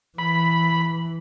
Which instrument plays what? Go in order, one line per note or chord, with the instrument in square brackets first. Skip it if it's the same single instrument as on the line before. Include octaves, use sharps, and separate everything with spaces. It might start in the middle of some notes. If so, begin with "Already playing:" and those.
[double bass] E3 [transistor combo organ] B5